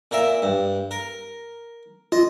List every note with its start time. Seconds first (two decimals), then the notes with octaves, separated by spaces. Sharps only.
0.11 A#2 A#4 E5
0.42 G2
0.91 A#4
2.12 F4 D#5